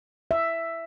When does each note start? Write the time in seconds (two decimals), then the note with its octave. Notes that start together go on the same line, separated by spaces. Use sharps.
0.31 E5